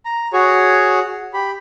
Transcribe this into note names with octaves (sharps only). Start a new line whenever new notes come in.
A#5
F#4 G#4 C#5
G4 B5